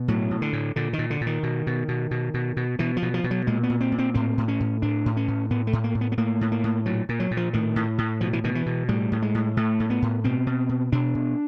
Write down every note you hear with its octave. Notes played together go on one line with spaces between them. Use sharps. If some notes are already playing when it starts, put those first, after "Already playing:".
Already playing: B2
A2 F#3
A2
D3
A2
A#2 D3
D#3
A#2
D3
A#2
D#3
B2
B2
B2
B2
B2
B2
B2 E3
F3
B2
F3
B2
F#3
A#2 G#3
B3
A#2
C4
A#2
C4
A2 C4
A2
C#4
A2
A2 D4
A2
C#4
A2
A2 B3
A3
A2
A#3
A2
B3
B3
A2 A#3
A2
A#3
A2
A#2 F#3
A#2
F#3
A#2
F3
A2 D#3
A2
A2
B2 F3
E3
B2 D#3
E3
B2
A2 G3
A2
G#3
A2
A2 A3
A2
B3
A2
B2 C4
B2
B2
B2 D4
B2